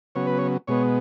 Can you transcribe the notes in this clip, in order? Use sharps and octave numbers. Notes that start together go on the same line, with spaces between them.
C#3 F#3 B3 C#5
B4
C#5
B2 G#3 B3 C#5